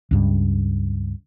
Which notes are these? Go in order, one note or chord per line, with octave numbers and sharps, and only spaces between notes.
C#2 G2